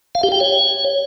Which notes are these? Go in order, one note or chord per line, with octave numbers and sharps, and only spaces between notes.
F5
G4
G5
C#5